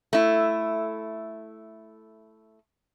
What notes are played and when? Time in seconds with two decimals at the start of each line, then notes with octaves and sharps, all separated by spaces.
0.13 A3 E4